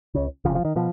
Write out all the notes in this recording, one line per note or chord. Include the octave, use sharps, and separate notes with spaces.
C#2 C#3
F1 F2 C#3 F3
F3
D#3
B2 F3